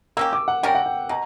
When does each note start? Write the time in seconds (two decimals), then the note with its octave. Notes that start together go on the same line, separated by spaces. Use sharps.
0.17 A#3 C#4 G4 E6
0.33 D6
0.48 F#5
0.63 G3 C#4 G4 A#4 G5
0.75 F#5
0.86 G5
1.09 B2 A#5